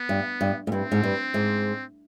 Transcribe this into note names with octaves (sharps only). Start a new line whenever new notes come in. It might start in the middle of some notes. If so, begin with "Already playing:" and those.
Already playing: B3
G2
G2
G#2
G2 C4
G#2
G2
G#2